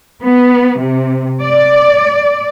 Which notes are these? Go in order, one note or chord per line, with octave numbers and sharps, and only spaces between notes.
B3
C3
D5